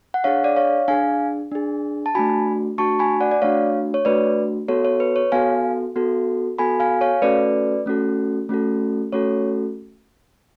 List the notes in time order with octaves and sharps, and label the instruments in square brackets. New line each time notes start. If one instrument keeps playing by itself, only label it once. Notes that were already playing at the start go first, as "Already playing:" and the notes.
[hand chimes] F#5
D4 G#4 C#5 F5
D5
C#5 F5
D4 G#4 F5 G#5
D4 G#4
A5
A3 D4 F#4 G#5 B5
A3 D4 F#4 A5 C#6
G#5 B5
D5 F#5
D5
A3 D4 F#4 C#5 F5
C#5
A3 D4 F#4 B4 D5
B3 F#4 A4 C#5
C#5
B4
C#5
B3 F#4 A4 F5 G#5
B3 F#4 A4
B3 F#4 A4 G#5 B5
F5 G#5
C#5 F5
A3 C#4 F#4 A4 B4 D5
A3 C#4 F#4 A4
A3 C#4 F#4 A4
A3 C#4 F#4 A4 C#5